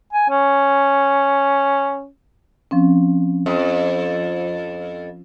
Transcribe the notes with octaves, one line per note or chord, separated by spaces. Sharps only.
G#5
C#4
F3 C4 C#4
F2